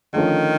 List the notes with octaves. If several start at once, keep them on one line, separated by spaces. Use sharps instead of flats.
D3 D#3 F3 A3 C#4 F4